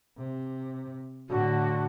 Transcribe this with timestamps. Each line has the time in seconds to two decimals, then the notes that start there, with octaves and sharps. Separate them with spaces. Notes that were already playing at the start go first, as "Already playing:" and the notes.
0.18 C3
1.30 A2 D3 F#4